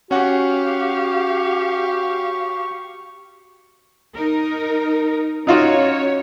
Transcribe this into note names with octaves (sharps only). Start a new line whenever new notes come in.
C#4 F#4 G4 F5 F#5 C#6
D#4 A#4
C#4 D#4 F4 F#4 C#5